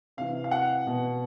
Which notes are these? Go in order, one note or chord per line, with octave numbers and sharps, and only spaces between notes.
C3 E3 F5
F5
F#5
B2